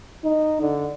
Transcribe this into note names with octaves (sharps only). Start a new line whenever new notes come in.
D#4
D3